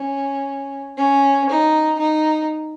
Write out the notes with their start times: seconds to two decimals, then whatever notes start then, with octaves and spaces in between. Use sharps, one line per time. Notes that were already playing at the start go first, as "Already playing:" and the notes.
Already playing: C#4
0.97 C#4
1.49 D#4
1.99 D#4